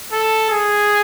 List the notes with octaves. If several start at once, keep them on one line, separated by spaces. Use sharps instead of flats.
A4
G#4